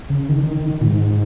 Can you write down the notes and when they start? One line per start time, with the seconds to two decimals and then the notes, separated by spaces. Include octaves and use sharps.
0.10 C#3
0.29 D#3
0.43 D#3
0.57 D#3
0.71 D#3
0.81 A#2
0.86 G#2